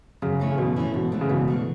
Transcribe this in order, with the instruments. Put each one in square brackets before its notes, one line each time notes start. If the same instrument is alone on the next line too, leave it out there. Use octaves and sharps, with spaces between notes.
[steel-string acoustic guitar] F#2 [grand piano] C#3
[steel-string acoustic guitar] E3 A3 C#4 E4
[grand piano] C#3
[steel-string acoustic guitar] F#2 [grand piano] B2
[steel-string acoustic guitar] E3 A3 C#4 E4
[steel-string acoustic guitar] G#2 [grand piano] B2
[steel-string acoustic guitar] E3 A3 D4
[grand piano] C#3
[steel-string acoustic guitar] G#2 [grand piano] B2
[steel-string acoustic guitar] E3 A3 D4